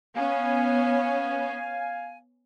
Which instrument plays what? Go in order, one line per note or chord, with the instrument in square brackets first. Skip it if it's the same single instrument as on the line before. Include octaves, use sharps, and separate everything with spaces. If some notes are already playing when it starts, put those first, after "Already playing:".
[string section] B3 C#4 [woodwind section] F5 G#5